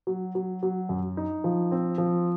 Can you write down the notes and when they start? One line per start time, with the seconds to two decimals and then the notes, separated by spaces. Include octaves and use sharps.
0.07 F#3
0.35 F#3
0.63 F#3
0.89 F#2
1.17 D#4
1.44 F3
1.72 C4
1.98 F3